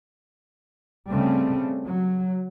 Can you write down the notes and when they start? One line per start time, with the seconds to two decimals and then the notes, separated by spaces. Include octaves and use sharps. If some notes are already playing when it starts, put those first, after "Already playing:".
1.12 C#3 G3 A3 C4 C#4
1.88 F#3